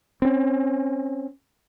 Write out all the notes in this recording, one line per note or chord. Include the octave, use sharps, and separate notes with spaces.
C4 C#4